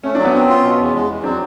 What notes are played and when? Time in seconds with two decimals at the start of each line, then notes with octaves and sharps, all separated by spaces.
0.04 A3 C#4
0.15 F#3 D4
0.25 B3 C#4
0.33 C4
0.49 F4
0.64 B2
0.78 E2
0.94 G#3
1.09 E2
1.23 F#3 C4 D4